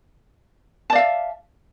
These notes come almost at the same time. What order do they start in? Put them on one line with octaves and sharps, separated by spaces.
A5 D5 F5 E5